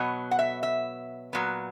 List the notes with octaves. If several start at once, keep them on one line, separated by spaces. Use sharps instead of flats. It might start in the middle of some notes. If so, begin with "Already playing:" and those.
Already playing: B2 F#3 B3
F#5
E5
E5
A#2 F#3 B3